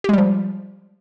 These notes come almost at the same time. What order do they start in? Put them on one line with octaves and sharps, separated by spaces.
G4 G#3 G3 F3